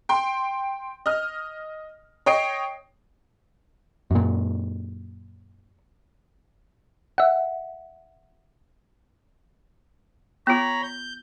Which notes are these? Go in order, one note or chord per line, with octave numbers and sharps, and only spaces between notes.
G5 C6
D#5 F6
C#5 D#5 G5 C7 D7
F#2 A#2
E5 F#5
B3 F4 C#5 A#5 B5
G6